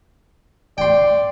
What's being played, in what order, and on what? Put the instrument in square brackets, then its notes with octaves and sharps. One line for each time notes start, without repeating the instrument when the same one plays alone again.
[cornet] D5 [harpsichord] G5 C6